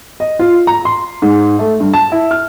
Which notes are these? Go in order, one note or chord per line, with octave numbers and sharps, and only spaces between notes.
D#5
F4
A#5
C6
G#2
A3
G2
A5
E4
F6